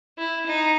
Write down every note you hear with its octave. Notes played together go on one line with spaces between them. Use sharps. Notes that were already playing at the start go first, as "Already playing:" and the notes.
E4
D#4